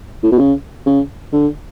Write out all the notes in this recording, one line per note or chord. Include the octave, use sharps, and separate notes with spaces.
A2
B2
C#3
C#3
D3